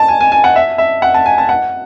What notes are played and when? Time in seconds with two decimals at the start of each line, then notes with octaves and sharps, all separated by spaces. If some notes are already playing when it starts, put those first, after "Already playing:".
Already playing: A5
0.08 G#5
0.20 G#5
0.32 G#5
0.44 F#5
0.56 E5
0.78 E5
1.02 F#5
1.14 A5
1.26 G#5
1.38 A5
1.49 F#5